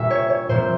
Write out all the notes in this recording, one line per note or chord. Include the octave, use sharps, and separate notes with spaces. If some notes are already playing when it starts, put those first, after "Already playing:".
Already playing: A#2 G3 C#4 E5
C#5
C#5
A#2 F3 C4 C5